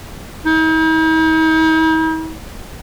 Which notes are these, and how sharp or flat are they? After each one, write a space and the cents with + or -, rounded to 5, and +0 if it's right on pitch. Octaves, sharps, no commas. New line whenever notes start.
D#4 +45